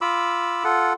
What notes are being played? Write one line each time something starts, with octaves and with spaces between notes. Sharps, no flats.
F4 B5 D6 E6
F4 A4 F#5